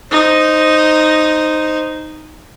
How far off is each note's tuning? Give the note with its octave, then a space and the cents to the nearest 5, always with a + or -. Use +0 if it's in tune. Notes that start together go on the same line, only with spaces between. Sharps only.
D#4 -5 C5 +0